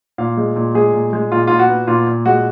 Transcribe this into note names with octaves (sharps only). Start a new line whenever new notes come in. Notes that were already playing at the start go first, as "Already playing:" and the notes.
A#2 F5
G#3
A#2
G#3 G#4
A#2
G#3
A#2 F4
A#2 F4
F#4
B3
A#2 F4
A#2
G#3 F#4